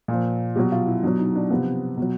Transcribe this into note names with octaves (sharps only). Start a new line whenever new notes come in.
A#2
F3
B2 F#3 G4
F4
E4
B2 F#3 D4
D#4
D4
C3 F3 B3
B2 F#3